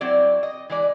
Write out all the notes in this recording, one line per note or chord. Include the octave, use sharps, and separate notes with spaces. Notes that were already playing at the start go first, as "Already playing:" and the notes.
F#3 C4 E4 D5
D#5
E3 G#3 D5